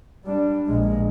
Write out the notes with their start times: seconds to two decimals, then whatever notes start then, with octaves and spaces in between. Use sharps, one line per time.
0.25 G3 D4
0.67 A#1 G#3